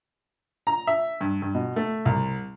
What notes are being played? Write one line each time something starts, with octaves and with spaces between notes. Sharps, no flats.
A#5
E5
G2
G2
B2
A3
C2